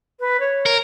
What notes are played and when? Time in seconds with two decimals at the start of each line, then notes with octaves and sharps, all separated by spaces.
0.20 B4
0.40 C#5
0.66 A#4